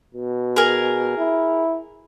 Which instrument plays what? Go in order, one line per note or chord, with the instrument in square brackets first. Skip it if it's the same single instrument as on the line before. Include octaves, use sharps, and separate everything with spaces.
[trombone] B2
[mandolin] G#4 A#4
[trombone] E4